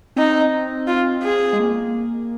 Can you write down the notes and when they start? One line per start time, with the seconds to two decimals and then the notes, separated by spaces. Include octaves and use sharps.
0.16 C4 D#4
0.87 F4
1.23 G#4
1.53 G#3
1.60 A#3